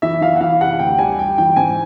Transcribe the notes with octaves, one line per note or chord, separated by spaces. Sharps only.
E3 E5
E3 F5
F#5
E3 F5
C3 F#5
D2 G5
G3 G#5
G3 G5
E3 G5
G#2 G#5